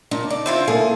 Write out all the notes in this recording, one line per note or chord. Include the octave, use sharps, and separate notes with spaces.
A#2 D4 D#4
D5
C4 E4 F4
A#3 E4 G#4 A4